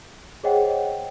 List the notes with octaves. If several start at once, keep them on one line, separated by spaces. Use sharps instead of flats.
G#4 C5 C#5 D#5 F#5 G5